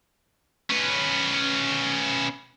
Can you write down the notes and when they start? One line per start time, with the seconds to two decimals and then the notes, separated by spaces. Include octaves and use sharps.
0.70 C#4 B4